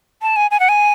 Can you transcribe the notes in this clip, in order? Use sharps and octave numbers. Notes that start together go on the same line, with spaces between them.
A5
G#5
G#5
F#5
G#5